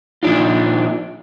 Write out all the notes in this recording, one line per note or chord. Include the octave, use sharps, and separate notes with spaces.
A#2 F3 G3 D4 D#4 F4